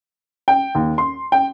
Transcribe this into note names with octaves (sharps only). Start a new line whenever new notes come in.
G5
D#2
C6
G5